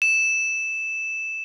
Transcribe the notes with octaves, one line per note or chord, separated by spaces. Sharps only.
E7